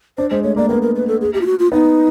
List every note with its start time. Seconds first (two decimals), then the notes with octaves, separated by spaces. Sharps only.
0.18 D4 C5
0.31 G#3 C5
0.43 A3 C#5
0.56 A#3 D5
0.69 B3 A#4
0.82 A#4
0.95 B4
1.08 A4
1.21 G#4
1.34 G4
1.41 F4
1.46 F#4
1.59 F4
1.72 B3 D#4